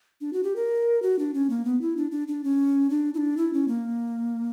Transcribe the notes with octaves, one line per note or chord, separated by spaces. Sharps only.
D4
F#4
G4
A#4
F#4
D4
C#4
A#3
B3
E4
D4
D4
D4
C#4
D4
E4
D4
E4
C#4
A#3